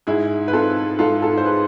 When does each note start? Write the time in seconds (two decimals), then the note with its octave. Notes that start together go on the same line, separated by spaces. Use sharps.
0.07 G#2 E4 G#4
0.48 B4
0.53 C4 F4 A4
0.99 G#2 F4 A4
1.22 F4 A4
1.37 C5
1.45 G#4 B4